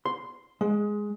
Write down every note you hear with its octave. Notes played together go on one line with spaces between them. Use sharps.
C6
G#3